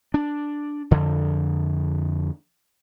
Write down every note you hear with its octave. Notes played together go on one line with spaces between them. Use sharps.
D4
F2 D3